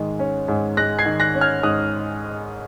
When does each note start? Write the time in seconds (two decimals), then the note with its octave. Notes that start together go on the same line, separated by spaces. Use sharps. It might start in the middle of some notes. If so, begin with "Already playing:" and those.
Already playing: G#2 D#3 G#3
0.19 C#4
0.48 G#2
0.77 G#3 F#6 A#6
0.99 G#6 C7
1.05 D#3
1.20 F#6 A#6
1.35 C#4
1.41 F6 G#6
1.63 G#2 D#6 F#6